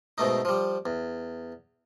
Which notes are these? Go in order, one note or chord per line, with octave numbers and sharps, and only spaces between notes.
G#2 B2 A3 D#4
F3 G3
E2